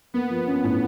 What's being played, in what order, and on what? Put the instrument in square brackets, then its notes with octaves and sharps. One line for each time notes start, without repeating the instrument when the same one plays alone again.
[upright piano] A#3 [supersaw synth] B3
[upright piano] F3
C#4
A2